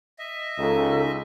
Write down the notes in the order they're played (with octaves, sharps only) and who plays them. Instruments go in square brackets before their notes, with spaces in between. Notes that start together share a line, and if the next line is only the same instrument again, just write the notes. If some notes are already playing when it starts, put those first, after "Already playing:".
[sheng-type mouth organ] D#5 E5
[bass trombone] C#2 [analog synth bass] D#4 [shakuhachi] A4